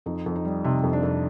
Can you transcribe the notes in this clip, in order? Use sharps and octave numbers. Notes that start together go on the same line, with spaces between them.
F2 D#4
F2
D#4
G3
C3 D#4
F2
D4
F2